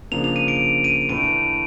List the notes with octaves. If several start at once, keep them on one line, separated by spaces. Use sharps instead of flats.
C#3 F3 A#3 D4 F4 F7
F7
D#7
D7
D#7
A2 E3 A3 D4 D7